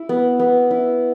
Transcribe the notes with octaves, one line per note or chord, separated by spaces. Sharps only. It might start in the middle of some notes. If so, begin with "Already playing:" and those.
Already playing: E4
B3
B3
E4